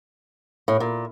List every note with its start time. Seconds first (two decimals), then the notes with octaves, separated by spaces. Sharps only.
0.68 A2
0.80 A#2